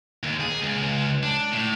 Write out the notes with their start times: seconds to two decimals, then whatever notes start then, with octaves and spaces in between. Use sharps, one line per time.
0.23 D#2
0.41 G#4
0.62 C#2
1.23 D4
1.52 A2